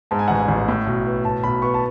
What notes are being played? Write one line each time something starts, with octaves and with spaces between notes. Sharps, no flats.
G#2 A5
G#5
A1 F#5
G#5
A1
A2
B1
B3
A2 A5
B1 B5
B3 C#6
A5